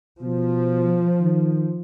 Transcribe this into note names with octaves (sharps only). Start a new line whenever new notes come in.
B2 F3
D#3